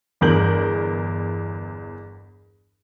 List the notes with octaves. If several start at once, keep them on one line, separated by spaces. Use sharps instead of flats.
G1 E2 A#4 G6 F#7